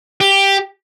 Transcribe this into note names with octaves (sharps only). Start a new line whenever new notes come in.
G4